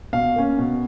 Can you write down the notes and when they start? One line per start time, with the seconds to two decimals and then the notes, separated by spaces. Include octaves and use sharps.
0.13 B2 F5
0.36 A#3 C#4
0.59 B2